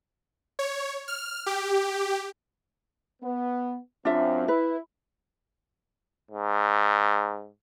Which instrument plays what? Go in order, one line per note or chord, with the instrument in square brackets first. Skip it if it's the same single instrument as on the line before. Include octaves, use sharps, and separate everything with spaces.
[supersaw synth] C#5
F6
G4
[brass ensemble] B3
[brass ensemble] F#2 C4 [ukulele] D4 F4 E5
[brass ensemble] E4 [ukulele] B4
[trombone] G#2